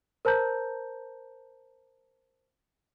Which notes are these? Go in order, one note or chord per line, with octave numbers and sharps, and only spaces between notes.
A#4 C5 A5 A#5 G6